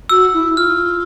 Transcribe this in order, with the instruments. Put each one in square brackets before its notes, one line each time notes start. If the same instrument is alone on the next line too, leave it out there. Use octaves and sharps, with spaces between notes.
[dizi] F#4 [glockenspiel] E6
[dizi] E4
[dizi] F4 [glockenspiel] F6